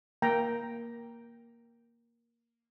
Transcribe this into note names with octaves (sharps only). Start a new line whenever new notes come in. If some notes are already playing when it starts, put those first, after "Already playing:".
A#3 G5 A#5